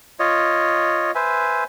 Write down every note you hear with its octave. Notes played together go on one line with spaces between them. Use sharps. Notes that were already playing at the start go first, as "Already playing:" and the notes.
F4 C#5 D#5
B4 C5 E5 G#5